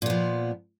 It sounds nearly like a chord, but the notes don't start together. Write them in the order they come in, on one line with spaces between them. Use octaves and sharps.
A#2 B3 F3